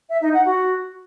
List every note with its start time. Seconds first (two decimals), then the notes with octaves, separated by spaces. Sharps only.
0.10 E5
0.22 D#4
0.34 F#5
0.46 F#4